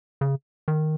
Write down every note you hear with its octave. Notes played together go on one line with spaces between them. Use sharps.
C#3
D#3